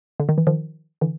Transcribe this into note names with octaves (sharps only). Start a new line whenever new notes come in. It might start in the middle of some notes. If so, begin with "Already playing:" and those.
D3
D#3
E3
D#3 F3
D3 E3